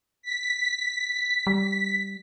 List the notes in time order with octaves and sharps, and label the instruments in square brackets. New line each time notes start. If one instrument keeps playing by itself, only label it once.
[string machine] B6
[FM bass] G3